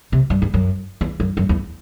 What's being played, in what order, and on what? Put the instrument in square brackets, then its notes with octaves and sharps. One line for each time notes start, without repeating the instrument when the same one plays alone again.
[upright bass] C3
G2
G2
F#2
E2
F#2
F#2
E2